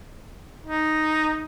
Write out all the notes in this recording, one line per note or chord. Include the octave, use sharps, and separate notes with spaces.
D#4